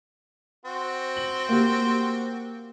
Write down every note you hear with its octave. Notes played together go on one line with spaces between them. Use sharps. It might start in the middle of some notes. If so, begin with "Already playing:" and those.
C4 F#4
F#7
A#3 G4